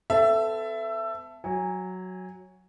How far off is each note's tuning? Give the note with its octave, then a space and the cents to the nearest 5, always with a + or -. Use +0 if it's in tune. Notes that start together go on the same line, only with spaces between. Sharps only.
B3 +40 A4 +0 E5 +20
F#3 +0 G#5 -20